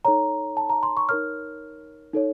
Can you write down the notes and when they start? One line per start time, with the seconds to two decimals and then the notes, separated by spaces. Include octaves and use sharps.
0.05 D#4 A4 C#5 A#5
0.57 A5
0.69 A#5
0.83 C6
0.97 C#6
1.09 D#4 A#4 C#5 F6
2.13 D#4 A4 C#5